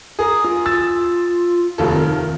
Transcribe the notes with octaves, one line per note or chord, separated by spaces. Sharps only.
G#4 A#4 D#6
F4
E6 A6
F1 D#2 A4
D#3 A#4